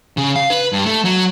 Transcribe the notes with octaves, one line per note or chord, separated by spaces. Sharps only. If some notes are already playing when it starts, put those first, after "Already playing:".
C#3
F5
B4
G2
A3
F#3